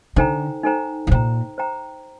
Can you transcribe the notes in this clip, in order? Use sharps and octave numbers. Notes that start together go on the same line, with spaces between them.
D3 D#4 A4 C5 G5 A#5
D#4 A4 C5 G5 A#5
A2
A#2 C5 G5 A#5
C5 G5 A#5